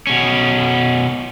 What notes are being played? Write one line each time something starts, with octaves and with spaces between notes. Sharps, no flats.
B2 C#4